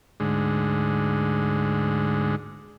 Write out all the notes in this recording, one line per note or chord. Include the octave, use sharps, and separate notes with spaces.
D2 G#2